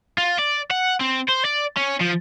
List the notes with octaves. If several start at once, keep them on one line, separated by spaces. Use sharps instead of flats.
F4
D5
F#5
C4
C5
D5
C#4
F3